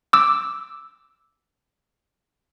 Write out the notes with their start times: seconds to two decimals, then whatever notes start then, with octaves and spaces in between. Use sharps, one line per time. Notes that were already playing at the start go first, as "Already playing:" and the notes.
0.13 D6 E6